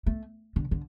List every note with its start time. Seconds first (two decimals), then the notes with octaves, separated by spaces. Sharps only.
0.06 A3
0.56 D3
0.71 D3